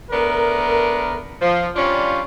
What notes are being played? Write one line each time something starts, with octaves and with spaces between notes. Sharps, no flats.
A3 B3 D4 A#4
F3
G3 C#4 D4 F4